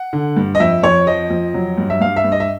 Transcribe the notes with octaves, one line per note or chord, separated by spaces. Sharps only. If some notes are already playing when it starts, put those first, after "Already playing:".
Already playing: F#5
D3
G2
D#5
F2 E5
F2 C#5
F3 D#5
F2
F#3
G2
E5
G2 F5
E5
G2
D#5
E5